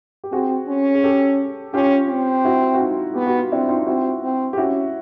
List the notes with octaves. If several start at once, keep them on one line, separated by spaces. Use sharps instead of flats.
G4
C4 F#4 G#4
C#4
G#4
G4 A4
C#4 F4 G4
C4
E4 F#4
F#4
D#4 F4
B3 G4
F#4
F4
C4 D4 E4
D#4 F4
C4 E4 F#4
C4
G4
C#4 E4 F#4